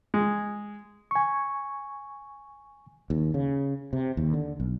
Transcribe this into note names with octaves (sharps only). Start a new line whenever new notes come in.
G#3
G#5 C#6
D#2
C#3
C3
D#2
D3
B1